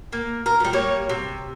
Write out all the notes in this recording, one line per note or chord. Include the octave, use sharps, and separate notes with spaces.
A#3
A#4
F3 G3
G3 A#3 C#5
C3